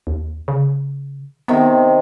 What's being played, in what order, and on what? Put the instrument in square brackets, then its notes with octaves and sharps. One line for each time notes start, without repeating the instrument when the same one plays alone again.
[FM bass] D#2
C#3
[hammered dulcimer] C3 D#3 [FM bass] B3